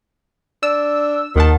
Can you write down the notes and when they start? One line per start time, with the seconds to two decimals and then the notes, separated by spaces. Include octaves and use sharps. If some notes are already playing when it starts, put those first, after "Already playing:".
0.63 D4 E6
1.36 D#2 D#3 F#5 A5